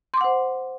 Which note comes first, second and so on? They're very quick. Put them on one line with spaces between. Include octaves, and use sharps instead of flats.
C6 D6 F#5 C5